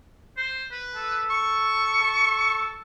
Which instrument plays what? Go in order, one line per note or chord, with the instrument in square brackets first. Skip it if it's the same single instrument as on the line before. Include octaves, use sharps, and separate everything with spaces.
[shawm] C5
B4
[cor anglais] A4
[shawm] C#6
[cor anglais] A4